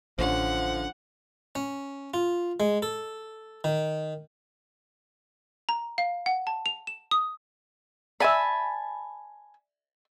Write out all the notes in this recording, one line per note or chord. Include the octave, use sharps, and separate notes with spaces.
A1 D3 F3 C#4 D4 F#5
C#4
F4
G#3
A4
D#3
A#5
F5
F#5
A5
F7
E7
D#6
D5 E5 G#5 A5 B5